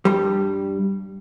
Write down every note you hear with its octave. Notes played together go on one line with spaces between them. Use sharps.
G2 G3